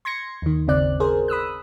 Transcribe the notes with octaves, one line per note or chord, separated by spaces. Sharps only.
C6 G#6 A#6 C#7
D#2 D#3
G1 D#2 C#3 C4 D5 F#6
G#4 A#4 C5
B5 D#6 E6 F#6